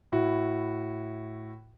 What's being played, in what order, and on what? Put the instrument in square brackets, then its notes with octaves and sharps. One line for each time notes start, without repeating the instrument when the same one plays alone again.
[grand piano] A2 E4 F#4